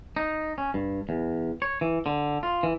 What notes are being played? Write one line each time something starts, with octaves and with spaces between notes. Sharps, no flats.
D#4
C#4
G2
E2
C#5
E3
D3
F4
E3